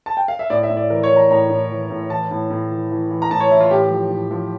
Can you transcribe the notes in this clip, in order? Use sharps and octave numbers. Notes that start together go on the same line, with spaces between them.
A5
G5
F5
E5
A2 D5
E5
A2
D5
E3 A#4
C#5
E3
A#5
A2 A#5
A2
E3
A2
E3 A5
A2
A2
E3
E3
E3
A#5
A2 A5
C#5
E3 E4
F4
A2 G4
F3
A2
F3